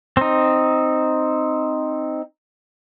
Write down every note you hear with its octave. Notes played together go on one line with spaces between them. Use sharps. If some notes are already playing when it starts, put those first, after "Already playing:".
C4 D#4